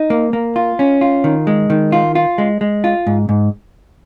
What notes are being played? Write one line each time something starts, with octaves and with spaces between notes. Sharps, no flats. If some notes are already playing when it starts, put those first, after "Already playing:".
Already playing: D#4
A#3
A#3
F4
C#4
F4
D#3
G#3
D#3
F4
F4
G#3
G#3
F4
G#2
G#2